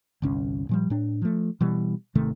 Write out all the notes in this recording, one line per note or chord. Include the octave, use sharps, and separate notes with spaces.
G1 C2 C#4
A#2 F3 G3
A2 D4
F3 A3
B2 E3 G3
G#1 C3 D#3 A3